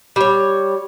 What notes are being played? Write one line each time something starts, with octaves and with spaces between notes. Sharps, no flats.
G3 C#5